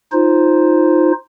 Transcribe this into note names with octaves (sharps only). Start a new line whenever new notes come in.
D#4 F4 C5